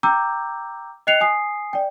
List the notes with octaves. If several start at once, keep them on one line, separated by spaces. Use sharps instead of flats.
G5 A#5 D6 E6 G6
D#5 G5 F#6 C7 C#7 F7
G#5 D#6 C7
D5 G5